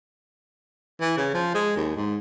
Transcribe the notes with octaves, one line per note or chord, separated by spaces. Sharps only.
E3
C#3
F3
G#3
D#2
G#2